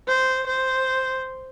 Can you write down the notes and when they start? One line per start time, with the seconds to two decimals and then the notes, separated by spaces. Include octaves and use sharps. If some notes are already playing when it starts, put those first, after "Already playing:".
0.08 C5
0.47 C5